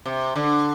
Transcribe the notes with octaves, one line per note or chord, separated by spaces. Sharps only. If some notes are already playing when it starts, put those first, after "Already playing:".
C3
D3